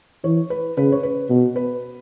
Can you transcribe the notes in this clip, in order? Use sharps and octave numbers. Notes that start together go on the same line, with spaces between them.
E3 C#5
B4
C#3 B4
C#5
B4
B2
B4